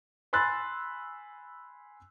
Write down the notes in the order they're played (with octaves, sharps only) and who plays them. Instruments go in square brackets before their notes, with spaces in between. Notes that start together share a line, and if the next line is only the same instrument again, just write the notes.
[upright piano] G#5 B5 C6 E6 F#6 A6